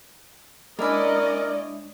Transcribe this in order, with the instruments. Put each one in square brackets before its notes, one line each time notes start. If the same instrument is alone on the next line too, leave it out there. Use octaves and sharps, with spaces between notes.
[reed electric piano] G#3 D4 [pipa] A#3 E4 [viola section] C#4 D5 D#5 [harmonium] A#4